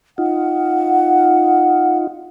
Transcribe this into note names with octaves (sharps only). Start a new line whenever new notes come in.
D#4 F4 F#5